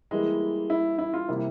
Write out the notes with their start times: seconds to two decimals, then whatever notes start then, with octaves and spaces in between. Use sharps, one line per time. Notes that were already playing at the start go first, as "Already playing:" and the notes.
0.11 E3 G3 G#3 A#3 E4
0.70 E4
0.98 E4
1.14 F4
1.28 C3 G3 A#3 E4